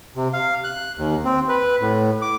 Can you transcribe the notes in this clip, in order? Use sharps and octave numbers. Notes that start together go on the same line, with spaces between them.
C3
F5
F#6
D#2
C4
B4
A2
D6